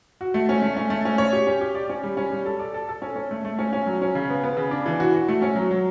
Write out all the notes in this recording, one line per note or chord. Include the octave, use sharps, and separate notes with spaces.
F#4
A3
C#4
A3
C#4
A3
C#4
C#5
G4
C#4
G4
D5
C#4
G3
C#4
G3
A4
D5
A4
A4
C#4
C#4
A3
A3
C#4
C#4
F#3
C#4
C#3
B3
B3
C#3
D4
E3
F#4
F#4
A3
C#4
F#3
F#3